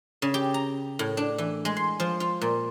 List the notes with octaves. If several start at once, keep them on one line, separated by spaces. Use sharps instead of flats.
C#3
G4
A#5
A2
D4
E3
G#3
C6
F3
F4
A#2